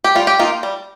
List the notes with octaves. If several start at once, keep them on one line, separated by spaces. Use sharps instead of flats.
G4
G3 F4
G4
A#3 D#4 F4
G3